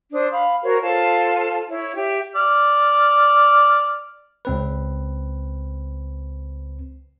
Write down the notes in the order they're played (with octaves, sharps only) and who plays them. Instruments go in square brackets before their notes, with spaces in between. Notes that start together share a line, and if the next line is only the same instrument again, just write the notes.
[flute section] D4 C5 D#6
F5 B5
F#4 A#4 C5 C#5
F4 A4 C5 A5
E4 C#5
G4 E5
[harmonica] D5 F6
[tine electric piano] C#2 C4 B4